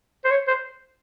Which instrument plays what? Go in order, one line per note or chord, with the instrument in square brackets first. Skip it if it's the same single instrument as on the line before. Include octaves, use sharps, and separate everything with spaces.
[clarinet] C5
C#5
C5